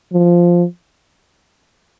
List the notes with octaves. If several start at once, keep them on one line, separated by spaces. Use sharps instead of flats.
F3